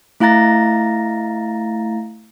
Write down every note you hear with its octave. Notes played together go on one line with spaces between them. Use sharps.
A3 E4 F5 A#5 A6 A#6